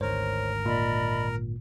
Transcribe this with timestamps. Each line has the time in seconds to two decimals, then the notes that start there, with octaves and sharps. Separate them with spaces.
0.01 G#1 D2 G#2 A#4 C5 C#5
0.66 A#2 D5 D#5 B5